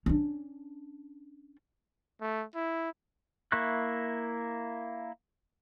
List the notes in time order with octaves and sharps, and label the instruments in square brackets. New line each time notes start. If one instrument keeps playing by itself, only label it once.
[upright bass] C#4 D4
[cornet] A3
E4
[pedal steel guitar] A#3 E4 E5 C#6 F#6